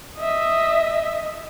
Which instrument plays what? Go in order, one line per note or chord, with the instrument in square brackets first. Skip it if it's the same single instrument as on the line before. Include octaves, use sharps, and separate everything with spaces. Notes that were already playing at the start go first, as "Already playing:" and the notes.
[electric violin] D#5 E5